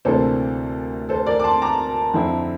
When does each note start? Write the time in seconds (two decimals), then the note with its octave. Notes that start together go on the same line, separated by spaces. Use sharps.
0.05 D2 C3 E3 A#3 D4 A4 C5
1.09 A4 C5
1.26 A#4 D5
1.40 D6
1.44 A5 C6
1.62 A#5 D6
2.14 F2 D3 F3 C4 E4